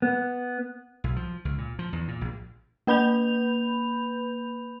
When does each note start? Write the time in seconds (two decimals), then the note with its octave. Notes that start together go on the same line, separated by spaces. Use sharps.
0.02 B3
1.04 B1
1.16 F3
1.45 C#2
1.58 A#2
1.79 F3
1.93 E2
2.08 A#2
2.21 A#1
2.87 A#3 B4 B5 G6 F7